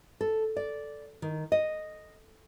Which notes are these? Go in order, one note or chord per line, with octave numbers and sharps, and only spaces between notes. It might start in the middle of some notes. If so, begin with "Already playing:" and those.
A4
D5
D#3
D#5